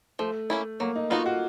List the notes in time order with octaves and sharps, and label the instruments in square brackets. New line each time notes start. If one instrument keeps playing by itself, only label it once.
[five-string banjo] F3 [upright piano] A3
[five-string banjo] A#3 C#4 E4
[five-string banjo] F#3 [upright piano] A#3
[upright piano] D#4
[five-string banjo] B3 D#4 F#4 [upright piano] F4
[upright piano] F#4